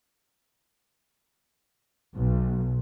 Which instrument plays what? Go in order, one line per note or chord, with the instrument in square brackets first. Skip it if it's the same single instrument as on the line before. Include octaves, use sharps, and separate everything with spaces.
[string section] B1